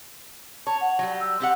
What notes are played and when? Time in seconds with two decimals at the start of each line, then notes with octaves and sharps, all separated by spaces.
0.67 C#5 A5
0.81 F#5
0.99 F#3 G3
1.20 E6
1.40 C4 G4 F#5